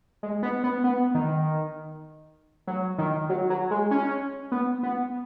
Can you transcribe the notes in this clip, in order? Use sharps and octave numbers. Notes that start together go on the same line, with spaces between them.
G#3
B3
B3
B3
D#3
F#3
D#3
F#3
F#3
G#3
C#4
B3
B3